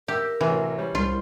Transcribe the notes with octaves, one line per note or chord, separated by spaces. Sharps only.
G4 A#4 E5 E6
A1 C3 E3 F#3
G3 C#4 C5
C2 F4